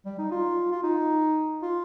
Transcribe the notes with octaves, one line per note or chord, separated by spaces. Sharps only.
G3
D#4
F4
F4
D#4
F4